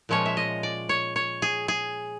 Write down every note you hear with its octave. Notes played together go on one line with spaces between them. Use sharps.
A#2 F3 G#3 C#4 C#5
E5
D#5
D5
C#5
C#5
G#4
G#4